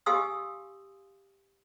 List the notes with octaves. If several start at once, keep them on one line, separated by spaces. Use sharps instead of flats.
G4 F5 G#5 C6 D#6 E6